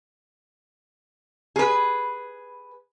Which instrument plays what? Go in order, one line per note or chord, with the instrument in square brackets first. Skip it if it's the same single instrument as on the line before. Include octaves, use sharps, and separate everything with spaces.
[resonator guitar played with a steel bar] G#4 B4